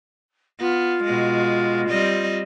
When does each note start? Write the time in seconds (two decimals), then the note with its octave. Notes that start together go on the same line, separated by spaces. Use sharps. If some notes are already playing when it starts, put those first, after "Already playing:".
0.60 B3 F4
1.04 B2 G#3
1.89 G3 C4 D#5